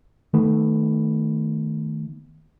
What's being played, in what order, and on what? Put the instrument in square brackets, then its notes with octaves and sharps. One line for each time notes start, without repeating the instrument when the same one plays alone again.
[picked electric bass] D#3 A3 B3